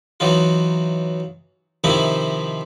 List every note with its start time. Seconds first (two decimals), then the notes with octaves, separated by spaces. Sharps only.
0.20 E3 F#3 D#4 F4
1.84 C3 D#3 F3 D#4 E4